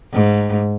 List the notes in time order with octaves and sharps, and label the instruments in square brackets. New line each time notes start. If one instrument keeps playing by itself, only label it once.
[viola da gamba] G#2